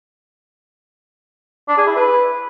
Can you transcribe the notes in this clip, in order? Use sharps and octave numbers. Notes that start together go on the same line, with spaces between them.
D4
G#4
E4
B4